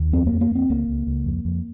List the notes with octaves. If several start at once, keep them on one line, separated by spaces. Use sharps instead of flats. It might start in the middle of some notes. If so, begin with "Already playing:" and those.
Already playing: D#2
F2 C4
A#3
F2
A#3
F2 C4
C#2 A#3
C#2
C#2
F2
F2